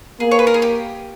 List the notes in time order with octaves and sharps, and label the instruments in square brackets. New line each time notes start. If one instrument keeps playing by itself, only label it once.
[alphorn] A#3 [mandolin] G#4
[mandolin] C#5
B4
A#4
G#4
G4